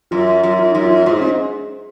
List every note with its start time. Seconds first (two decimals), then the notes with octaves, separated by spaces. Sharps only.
0.11 F#2 F4
0.44 F#2
0.59 F4
0.72 F#2 D#4
0.85 F4
1.06 G#2 F4
1.13 D#4
1.21 C#4